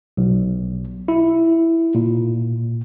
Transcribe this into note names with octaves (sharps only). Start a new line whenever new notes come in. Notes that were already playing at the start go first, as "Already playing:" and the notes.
B1
E4
A#2